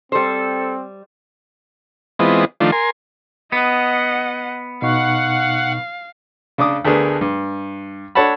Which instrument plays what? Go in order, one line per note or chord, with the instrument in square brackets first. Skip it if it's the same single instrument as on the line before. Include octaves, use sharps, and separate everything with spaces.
[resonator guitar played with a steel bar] G3 C5 [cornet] C4 [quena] A4
[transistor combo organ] E3 G#3 B3 C4 F4 D#5
D#3 F3 A3 D4 F4
A#4 G#5 C6
[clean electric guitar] B3 [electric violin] D#5 F#5
[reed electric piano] B2 D#4 C#6 [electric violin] F5 [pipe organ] F#5
[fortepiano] C#3 D4 D6 D#6
D2 A3 B3 D4 G#4 A#4
G2
D4 A4 C#5 F#5 A5 B5